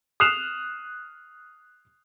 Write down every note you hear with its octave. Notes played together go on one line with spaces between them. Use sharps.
D#6 F6 F#6 C7 E7 F7